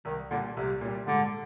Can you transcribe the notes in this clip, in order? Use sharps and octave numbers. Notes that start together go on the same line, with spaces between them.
C2 D#3
A#2 D3 G3
C2 C3
A#2 G3
G#2 D3